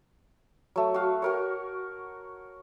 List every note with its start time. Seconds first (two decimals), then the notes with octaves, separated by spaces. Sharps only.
0.76 F#3 A3
0.94 F#4 F5
1.22 F#4 A#4 C#5